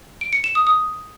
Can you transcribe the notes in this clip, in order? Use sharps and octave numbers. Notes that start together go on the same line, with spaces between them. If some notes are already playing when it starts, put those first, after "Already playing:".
D7
C#7
E7
D#6
D#6